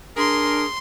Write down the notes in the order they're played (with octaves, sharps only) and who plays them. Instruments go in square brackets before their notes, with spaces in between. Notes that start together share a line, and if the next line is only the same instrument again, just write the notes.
[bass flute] D4 [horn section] G#4 A#4 [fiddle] C6